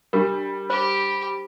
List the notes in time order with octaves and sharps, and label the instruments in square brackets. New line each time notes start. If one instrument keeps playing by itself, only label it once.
[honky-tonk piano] G3 [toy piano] D4 G4 A#4
[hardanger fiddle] G4 [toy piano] C5 [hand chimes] B5